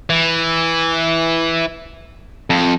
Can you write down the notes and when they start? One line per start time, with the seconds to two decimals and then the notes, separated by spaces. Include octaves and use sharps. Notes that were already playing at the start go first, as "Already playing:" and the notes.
0.10 E3
2.50 F2